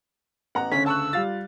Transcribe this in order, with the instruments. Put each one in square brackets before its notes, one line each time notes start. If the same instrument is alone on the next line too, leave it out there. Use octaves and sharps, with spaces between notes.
[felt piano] A1 B3 F#6 [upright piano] F#5 A#5
[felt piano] D2 C#3 [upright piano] C#4 [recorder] B6
[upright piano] A5 C#6 F#6 [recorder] E6
[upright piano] G3 F5 A6 [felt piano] F4